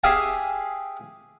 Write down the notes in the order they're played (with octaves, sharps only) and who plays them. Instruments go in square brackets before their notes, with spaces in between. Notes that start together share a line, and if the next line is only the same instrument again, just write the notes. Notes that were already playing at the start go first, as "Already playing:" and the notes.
[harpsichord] G4 G#4 E5 F5 G5 G#5